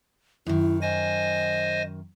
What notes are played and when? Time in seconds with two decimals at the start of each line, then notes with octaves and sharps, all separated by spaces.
0.46 F#2 D#3 E4
0.82 C5 D#5 G#5 A#6